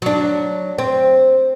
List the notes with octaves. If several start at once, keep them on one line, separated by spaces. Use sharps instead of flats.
F#3 D4
C4